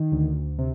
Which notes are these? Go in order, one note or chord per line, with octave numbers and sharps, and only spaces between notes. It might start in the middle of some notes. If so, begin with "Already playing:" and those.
Already playing: D#3
D2
C3